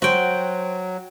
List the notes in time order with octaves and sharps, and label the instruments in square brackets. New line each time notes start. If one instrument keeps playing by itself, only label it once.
[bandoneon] F#3 [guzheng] F#4 G5 [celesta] C5 F#5 C6